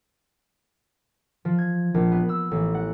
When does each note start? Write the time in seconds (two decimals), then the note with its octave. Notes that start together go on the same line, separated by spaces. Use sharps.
1.45 F3
1.58 G#6
1.94 A#1
2.12 B3
2.29 E6
2.51 A1
2.75 F#5